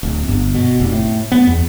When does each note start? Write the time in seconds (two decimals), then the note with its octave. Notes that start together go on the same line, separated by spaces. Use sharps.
0.03 D1
0.28 G1
0.55 B2
0.80 F1
0.92 A2
1.32 B3
1.47 E2